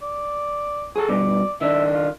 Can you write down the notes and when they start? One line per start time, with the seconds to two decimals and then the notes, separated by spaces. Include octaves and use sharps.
0.02 D5
0.96 F#3 G#4 A4
1.09 G2 B2 D5
1.61 D#3 D4 E5
1.95 F4